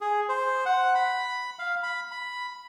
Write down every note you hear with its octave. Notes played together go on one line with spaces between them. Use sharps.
G#4
C5
F#5
B5
F5
B5
B5